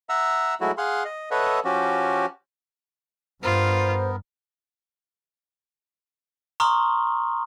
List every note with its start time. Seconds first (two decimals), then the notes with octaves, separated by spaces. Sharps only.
0.09 E5 F#5 A#5 E6
0.61 F#3 G#3 A3 E4 F#4
0.78 G#4 F5 F#5 C6
1.05 D#5
1.31 A4 B4 C#5 D#5 E5 F#5
1.65 F3 C#4 F#4 G4
3.43 G2 B3 F4 A#4 C5
6.60 A#5 C6 C#6 D#6 F6